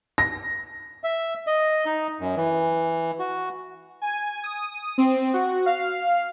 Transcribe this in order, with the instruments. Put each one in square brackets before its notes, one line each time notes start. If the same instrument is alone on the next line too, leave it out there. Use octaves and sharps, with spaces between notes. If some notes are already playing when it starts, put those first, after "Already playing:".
[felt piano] A#6
[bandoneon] E5
D#5
D#4
F#2
E3
F#4
[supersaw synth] G#5
D#6
C4
F#4
F5